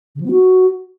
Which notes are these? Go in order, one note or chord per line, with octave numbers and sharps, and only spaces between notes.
C#3
F3
B3
F#4